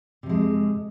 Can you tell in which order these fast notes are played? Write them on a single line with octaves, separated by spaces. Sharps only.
C3 F2 G#3